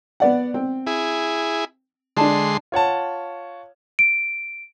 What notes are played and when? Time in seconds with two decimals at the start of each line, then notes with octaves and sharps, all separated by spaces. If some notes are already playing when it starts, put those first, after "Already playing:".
0.20 B3 D5 F#5
0.54 C4
0.87 E4 G#4
2.17 D3 G#3 D4 A5 C6
2.72 F4 C#5 F#5 A5
3.99 D7